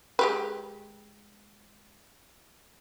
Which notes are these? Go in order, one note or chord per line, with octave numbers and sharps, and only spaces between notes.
G#3 G4 B4